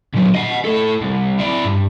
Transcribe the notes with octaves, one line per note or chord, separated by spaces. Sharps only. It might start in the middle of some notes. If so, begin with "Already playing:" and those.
A#2 F#3
D#5 F#5
A2 A4
C2
E4 D5
G2